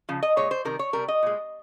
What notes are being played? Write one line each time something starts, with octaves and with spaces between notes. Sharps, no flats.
C#3 F3
D#5
A#2 G#3 C#5
C5
C3 D#3 G3 A#4
C#5
C3 G3 A#4
D#5
A#2 G#3